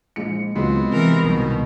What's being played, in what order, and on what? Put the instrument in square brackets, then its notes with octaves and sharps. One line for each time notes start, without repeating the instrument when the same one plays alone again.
[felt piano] A#1 G#3 C#7
[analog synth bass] C#2 [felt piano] F#3 G#3 F4 [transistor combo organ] B3 C4
[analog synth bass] C3 [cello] E3 A#4
[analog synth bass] C2 [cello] B2 [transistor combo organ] D#3